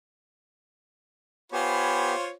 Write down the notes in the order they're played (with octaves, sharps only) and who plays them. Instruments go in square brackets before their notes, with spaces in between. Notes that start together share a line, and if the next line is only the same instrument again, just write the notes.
[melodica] B3 G4 [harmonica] F4 C5 C#5 [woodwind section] G#5 B5